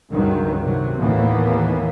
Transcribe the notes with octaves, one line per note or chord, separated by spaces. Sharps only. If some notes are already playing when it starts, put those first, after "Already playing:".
C#2 G2 D#3 F#3
C3 F#3
D#2 A2 E3 A#3 B3